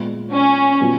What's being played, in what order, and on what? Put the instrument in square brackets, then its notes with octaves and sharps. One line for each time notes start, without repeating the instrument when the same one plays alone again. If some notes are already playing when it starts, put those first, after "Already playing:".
Already playing: [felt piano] A#2 G#3 B3
[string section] C#4
[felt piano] A#2 F#3 B3 F#4